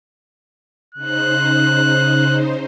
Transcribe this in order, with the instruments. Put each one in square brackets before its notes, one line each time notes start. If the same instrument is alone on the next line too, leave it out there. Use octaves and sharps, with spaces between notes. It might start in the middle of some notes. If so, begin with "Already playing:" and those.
[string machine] C#3 D#4 C5 [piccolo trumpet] F#6